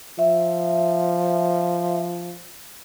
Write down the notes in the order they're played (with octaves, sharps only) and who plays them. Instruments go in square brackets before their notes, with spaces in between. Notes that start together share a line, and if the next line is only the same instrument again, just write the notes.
[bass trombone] F3 [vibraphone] E5